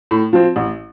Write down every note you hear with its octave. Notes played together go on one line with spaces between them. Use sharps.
A2
F3 C4
A1